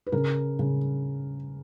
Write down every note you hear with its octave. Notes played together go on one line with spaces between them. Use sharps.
B4
C#3 A#4
C#3